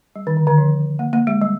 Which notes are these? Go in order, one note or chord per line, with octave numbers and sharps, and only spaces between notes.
G3
D#3
D3
D3
F3
A#3
A#3
G#3
G3